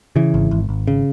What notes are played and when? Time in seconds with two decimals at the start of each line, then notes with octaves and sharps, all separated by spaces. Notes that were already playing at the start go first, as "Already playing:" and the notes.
0.16 C#3 E3
0.34 G#1
0.51 G#1
0.69 G#1
0.87 C#3